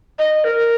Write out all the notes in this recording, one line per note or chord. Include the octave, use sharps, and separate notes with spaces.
D#5
A#4